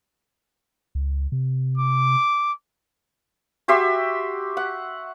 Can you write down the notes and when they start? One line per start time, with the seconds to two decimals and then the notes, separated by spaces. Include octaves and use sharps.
0.95 C#2
1.32 C3
1.78 D6
3.68 F#4 G4 E5 C6
4.57 F#5